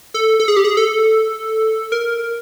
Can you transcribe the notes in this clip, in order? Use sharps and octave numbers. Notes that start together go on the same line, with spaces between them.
A4
A4
G#4
G4
G#4
A4
A#4